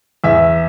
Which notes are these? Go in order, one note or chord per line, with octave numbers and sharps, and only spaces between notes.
E2 E5